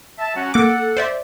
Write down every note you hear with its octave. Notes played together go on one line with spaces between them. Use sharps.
E5 A5
F#3 C#4 F#4
A#3 A4 F#5 D6
C5 D5 E5